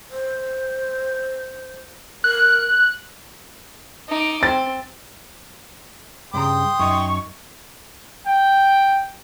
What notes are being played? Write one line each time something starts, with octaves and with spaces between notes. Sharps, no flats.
C5
A#4 F#6
D#4 D6
C4 A6
G2 C#3 G5 A#5 C6 D#6
F#2 D#4 C#6
G5